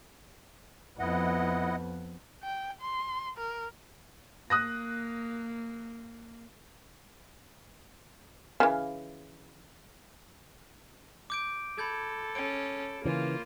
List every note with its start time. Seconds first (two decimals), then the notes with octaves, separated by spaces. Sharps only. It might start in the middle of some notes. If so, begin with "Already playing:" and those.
0.99 F2 B3 E4 D#5 F#5
2.43 G5
2.81 C6
3.38 A#4
4.50 A#3 D#6 F#6 A#6
8.60 C#3 E3
11.30 D6 G6 D7
11.78 A4 B5 G6 G#6
12.35 C#4 D7
13.05 C#3 E3 A#3 F4